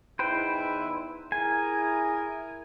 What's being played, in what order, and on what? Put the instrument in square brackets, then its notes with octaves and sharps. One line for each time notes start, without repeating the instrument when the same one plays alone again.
[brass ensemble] E2 D#4 E4 [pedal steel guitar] B4 C5 G5
[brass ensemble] E4 G#4 A#4 [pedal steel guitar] G#5